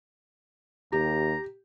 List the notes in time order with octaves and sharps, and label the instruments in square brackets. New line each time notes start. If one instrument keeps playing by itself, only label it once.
[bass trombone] D#2 [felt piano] G4 [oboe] A#5